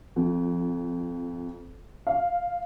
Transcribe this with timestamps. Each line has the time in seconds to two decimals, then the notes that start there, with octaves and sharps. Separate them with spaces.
0.16 F2
2.07 F5